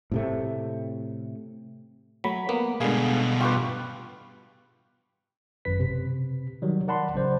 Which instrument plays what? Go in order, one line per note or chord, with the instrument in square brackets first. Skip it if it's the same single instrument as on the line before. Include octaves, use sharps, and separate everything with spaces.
[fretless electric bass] A2 C3 A3
[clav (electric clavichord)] F#3 [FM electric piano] A3 B5 B6
[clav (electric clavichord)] A#3 B3
[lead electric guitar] G2 B2 [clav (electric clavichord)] D3 G#4 [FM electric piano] G#3 F5
[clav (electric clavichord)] F4 G4 B4 [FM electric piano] G5 C#6
[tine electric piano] G#1 F#2 B4 B6
C3
D#3 F#3 G3
A#4 D5 F#5 A5 B5 C6
A1 C#3 F#3 C5 D5